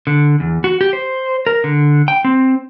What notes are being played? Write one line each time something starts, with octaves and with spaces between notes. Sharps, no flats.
D3
E2
F#4
G4
C5
A#4
D3
G5
C4